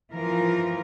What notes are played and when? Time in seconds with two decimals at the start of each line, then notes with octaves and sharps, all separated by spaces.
0.12 E3 F3 F4 A#4